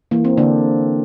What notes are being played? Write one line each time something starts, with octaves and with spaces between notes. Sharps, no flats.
E3 A#3
C4
D3 A#3 D4